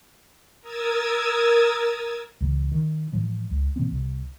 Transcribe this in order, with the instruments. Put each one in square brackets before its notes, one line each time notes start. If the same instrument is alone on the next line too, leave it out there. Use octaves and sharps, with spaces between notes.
[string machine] A#4 D#6 E6 G#6 A6
[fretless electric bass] C#2 C#3 E3
D#3
A2 E3 F3 G#3
C#2
B2 E3 A#3 C4
C2 C3